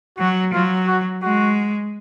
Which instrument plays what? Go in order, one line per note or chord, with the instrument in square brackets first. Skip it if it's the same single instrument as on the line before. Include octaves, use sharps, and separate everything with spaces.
[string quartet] F#3 [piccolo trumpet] F#4
[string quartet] F#3 [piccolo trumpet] F4
[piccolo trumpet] F#4
[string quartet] G#3 [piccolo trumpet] F#4